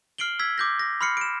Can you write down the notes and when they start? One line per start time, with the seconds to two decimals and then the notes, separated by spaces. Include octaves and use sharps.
0.18 F6 C7 D7 F#7 G7
0.39 E6 G#6 B6
0.58 D6 G6 A#6
0.79 A#6
1.01 B5 C6 F6 C7 C#7
1.17 D7 E7